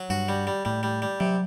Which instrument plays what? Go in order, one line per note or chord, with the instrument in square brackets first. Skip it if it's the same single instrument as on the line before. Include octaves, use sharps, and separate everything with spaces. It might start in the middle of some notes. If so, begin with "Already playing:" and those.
Already playing: [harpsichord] F#3
[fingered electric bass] G2 [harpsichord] F#4
[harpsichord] G3
G3
[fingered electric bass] A2 [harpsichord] G3
[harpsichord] G3
G3
[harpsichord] C3 [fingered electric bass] F#3